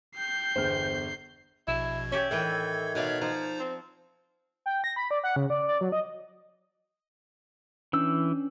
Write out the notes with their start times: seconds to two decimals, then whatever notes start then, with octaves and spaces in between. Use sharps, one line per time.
0.16 G5 G6 C7
0.56 G1 E2 C5 F6
1.68 A#1 B2 E4 G#6
2.12 C#4 G4 D5 E5
2.31 A2 D#3 E3 A4 G5
2.95 B2 D#4 C#5 D5 E5 F5
3.21 F3 D#4 C5 A#5
3.60 C4
4.66 G5
4.84 A#6
4.96 B5
5.11 D5
5.24 F#5
5.36 C#3
5.50 D5
5.68 D5
5.81 F#3
5.92 D#5
7.93 E3 C#4 D4 E6